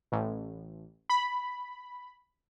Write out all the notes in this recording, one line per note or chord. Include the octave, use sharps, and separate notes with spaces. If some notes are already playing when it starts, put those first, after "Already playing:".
A1
B5